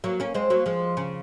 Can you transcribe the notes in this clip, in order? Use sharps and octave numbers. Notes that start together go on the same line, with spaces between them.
F#3 A#3
A#3 C#4
G#3 C4
F#3 A#3
F3 G#3
C#3